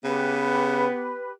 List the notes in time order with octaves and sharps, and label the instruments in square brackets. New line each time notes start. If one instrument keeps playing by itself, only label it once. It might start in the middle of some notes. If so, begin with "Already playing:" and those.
[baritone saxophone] C#3 [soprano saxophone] B3 [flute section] G4 B4